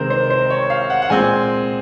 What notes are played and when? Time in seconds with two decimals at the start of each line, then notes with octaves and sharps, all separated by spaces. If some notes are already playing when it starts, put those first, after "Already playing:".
Already playing: C3 D#3 G#3 C4 A#4 C5
0.10 C5
0.30 C5
0.50 C#5
0.70 F5
0.90 F#5
1.02 F#5
1.10 A#2 G#3 C4 G#5